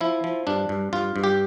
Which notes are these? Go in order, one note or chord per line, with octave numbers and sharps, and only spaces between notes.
F3 E4
F3
G2 D4
G2
G2 F4
G2
G4